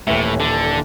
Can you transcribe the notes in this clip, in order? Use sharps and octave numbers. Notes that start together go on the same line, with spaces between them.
D#1 A2 E3 E4
D3